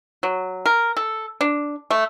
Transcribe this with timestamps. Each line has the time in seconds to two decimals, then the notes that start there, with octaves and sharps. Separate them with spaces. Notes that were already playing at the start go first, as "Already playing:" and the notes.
0.23 F#3
0.66 A#4
0.97 A4
1.41 D4
1.91 A3